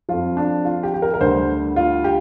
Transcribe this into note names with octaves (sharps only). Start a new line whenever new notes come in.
F2 F3 F4
D4
F4
G4
G4
A#4
A#4
D2 D3 G3 C5
F4
G4